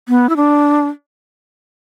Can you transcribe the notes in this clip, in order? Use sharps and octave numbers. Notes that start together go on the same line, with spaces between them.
B3
E4
D4